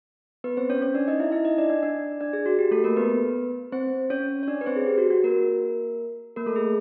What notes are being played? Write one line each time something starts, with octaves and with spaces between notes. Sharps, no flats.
B3 B4
C4 C5
C#4 C#5
C#4 C#5
D4 D5
D#4 D#5
E4 E5
E4 E5
D#4 D#5
D4 D5
D4 D5
D4 D5
D4 D5
G#4
F#4
G4
A3 A4
A#3 A#4
B3 B4
C4 C5
C#4 C#5
C#5
D4 D5
B4
C4 C5
G#4
G4
F#4
F#4
A#3 A#4
A#3 A#4
A3 A4
G#4